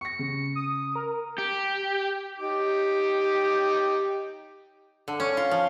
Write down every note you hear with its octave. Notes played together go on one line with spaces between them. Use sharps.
C#6 A#6 C#7
C#3
D#6
A#4
G4
D#4 G4 D6
D3
C#4
F4
F3